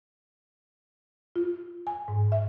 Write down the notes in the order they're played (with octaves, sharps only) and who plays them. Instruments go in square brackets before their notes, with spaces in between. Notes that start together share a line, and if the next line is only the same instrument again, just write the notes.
[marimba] F4
G#5
G#2
E5